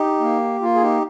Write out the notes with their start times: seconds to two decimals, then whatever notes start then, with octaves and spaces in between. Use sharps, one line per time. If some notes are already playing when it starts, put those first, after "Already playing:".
Already playing: D#4 G4
0.20 A#3
0.61 A#3 F4
0.74 G#4
0.81 D#4 G4